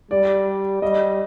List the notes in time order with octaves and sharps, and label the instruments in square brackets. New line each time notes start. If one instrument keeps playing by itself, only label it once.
[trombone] G3 [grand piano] D5
[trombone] G3 [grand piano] D#5